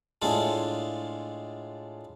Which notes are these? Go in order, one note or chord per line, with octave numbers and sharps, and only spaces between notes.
A2 G#3 D4 F4 A4